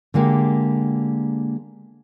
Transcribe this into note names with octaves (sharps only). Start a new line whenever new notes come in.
D3 G#3 A#3 G4